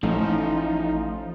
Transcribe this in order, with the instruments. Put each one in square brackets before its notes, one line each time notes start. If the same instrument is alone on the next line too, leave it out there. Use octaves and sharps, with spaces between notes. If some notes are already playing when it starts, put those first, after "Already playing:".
[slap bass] A1 [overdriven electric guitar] F3 [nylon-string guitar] A3 C#4 [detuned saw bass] D#4